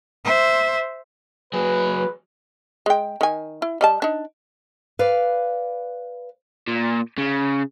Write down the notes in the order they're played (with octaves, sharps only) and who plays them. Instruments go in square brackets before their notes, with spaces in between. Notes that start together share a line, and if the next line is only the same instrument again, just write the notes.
[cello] C5 E5
[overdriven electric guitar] F#3 G#4 [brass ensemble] B4
[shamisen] G#3 G5
D#3 G#5
E4
G3 D#5 A5
D4 D#4
[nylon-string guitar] B4 D5 F5
[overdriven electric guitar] A#2
C#3